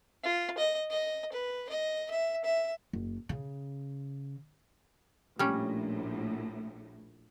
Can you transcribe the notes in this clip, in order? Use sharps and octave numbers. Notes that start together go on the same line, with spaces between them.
F4
D#5
D#5
B4
D#5
E5
E5
F#1
C#3
A#1 A2 G3 C#4